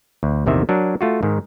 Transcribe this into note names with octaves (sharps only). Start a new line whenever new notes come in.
D2
A#1 E2 C3 D#3 E5
F#3 D4 A#4
A3 F4 F#4
G#2 D#3